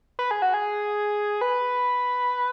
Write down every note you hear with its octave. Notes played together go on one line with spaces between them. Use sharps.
B4
G#4
F#4
G#4
B4